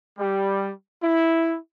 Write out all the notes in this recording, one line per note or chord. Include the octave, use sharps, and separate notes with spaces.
G3
E4